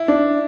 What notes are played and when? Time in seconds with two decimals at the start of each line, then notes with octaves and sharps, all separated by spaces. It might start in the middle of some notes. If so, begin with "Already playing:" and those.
Already playing: E4
0.08 D4